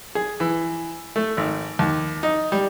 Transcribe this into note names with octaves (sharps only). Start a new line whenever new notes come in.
G#4
E3
A3
G#1
D#2
D#4
G3